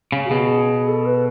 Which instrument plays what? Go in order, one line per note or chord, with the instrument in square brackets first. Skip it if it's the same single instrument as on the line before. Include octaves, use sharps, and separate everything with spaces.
[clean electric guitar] C#3
[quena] F#4
[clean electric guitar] B2 [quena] G#4
[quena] A4
B4